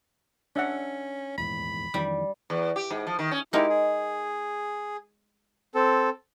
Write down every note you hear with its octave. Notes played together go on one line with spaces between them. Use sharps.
C#4 D4 E5 F#5
D#1 E2 G#2 B5
F2 D#3 E3 G3
E2
G4
G#2
F3
D#3
C#4
G#3 D#4 E4 G4 A#4
G#4
C4 A4